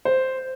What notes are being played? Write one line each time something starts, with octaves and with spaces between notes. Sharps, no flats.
C5